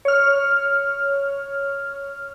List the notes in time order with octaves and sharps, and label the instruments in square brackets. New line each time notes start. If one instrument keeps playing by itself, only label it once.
[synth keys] C#5 F6